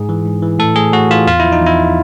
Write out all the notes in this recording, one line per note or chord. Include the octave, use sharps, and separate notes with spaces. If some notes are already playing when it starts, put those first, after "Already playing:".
Already playing: G#2 G#4
E3
G#2
E3
A2 A4
A2 G#4
A2 F#4
E3 F4
E2 F4
E4
F3
D#4
E2 E4